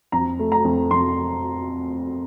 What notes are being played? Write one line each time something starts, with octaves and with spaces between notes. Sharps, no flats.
F2 A#5
A3
A#5
F2
F2 C6